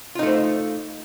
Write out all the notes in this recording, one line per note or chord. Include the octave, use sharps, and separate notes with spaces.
A3 D#4 F4 C5